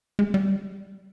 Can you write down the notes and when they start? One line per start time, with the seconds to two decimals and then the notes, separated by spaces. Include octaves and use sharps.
0.19 G#3
0.34 G3